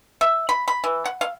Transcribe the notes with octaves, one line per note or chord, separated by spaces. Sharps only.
E5
B5
B5
E3
F#5
F5